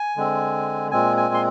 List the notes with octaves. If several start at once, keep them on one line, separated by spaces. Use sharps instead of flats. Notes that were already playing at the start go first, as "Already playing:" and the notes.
Already playing: G#5
D3 G#3 C4
A#2 G#3 C4 G#5
G#5
C6